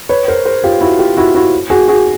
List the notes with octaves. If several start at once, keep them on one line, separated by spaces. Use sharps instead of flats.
B4 C#5
A#4 C5
A#4 C5
F4 G4
E4 F#4
F4 G4
E4 F#4
E4 F#4
F#4 G#4
F#4 G#4